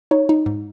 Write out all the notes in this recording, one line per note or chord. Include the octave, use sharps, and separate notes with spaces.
D#4 C#5
D#4
G#2